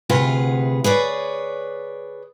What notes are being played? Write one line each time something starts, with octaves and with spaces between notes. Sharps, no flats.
D2 C3 F4 G#4 B4 F#5
G#4 B4 C#5 D5